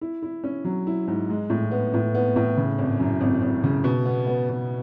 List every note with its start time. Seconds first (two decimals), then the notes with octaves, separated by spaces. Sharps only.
0.01 E4
0.22 E4
0.44 C#4
0.65 F#3
0.87 E4
1.07 G#2
1.30 G#3
1.50 A2
1.71 B3
1.94 A2
2.15 B3
2.36 A2
2.57 C#3
2.78 G#1
3.00 F#2
3.21 G#1
3.42 G#1
3.64 C#3
3.84 B2
4.05 B3
4.27 B3
4.49 B2